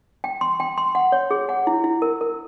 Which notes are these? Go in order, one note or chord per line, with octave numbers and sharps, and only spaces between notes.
G5
C6
G5
C6
F#5
C#5
G#4
F#5
E4
E4
A#4
A#4